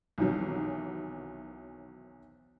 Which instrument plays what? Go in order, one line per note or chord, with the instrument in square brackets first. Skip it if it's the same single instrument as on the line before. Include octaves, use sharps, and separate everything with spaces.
[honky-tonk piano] B1 C3 D#3 E3 F#3